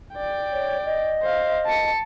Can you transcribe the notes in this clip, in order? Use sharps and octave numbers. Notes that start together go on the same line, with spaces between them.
D5 G5
C#5
D#5
C5 F5
A5 C#7